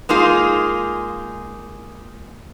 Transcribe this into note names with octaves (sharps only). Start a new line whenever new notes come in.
G#3 A#3 D#4 F4 G#4